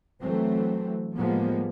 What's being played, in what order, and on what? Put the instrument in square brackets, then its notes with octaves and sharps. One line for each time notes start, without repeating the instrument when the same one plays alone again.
[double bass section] E3 F#3 A3 C4
A2 F3 G3 G#3 A#3 B3